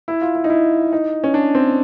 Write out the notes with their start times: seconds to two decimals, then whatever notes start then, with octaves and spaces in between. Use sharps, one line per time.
0.08 E4
0.21 F4
0.35 E4
0.44 D#4
0.50 E4
0.93 D#4
1.24 C#4
1.34 D4
1.55 C4